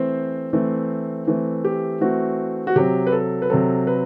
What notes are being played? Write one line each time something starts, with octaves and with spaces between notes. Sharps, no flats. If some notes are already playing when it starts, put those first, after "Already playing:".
Already playing: E3 A3 C4 C5
E3 A3 C4
E3 A3 C4
G4
E3 A3 C4 F#4
F#4
C3 F#3 C4 G4
B4
A4
B4
C3 F#3 C4 A4
B4